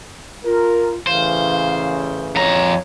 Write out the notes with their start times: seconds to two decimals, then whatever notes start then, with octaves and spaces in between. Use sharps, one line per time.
0.45 F4 A#4
1.07 A1 C#3 E3 C5 F5
2.36 F2 C#5 A#5